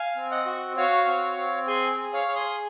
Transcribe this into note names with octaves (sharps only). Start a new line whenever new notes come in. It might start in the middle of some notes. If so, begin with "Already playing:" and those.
Already playing: F5 G#5
C4
D#5 F#5
F#4
F#4 C#5 F5
C4
C4
G#4 G#5 C6
G#4
C#5 F5
G#4
C6 D#6